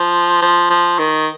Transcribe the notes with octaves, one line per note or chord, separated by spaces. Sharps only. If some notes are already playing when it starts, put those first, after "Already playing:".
Already playing: F3
F3
F3
D#3